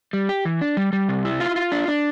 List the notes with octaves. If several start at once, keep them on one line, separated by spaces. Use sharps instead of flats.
G3
G4
E3
D4
G3
G3
C3
E4
F4
F4
D4
D4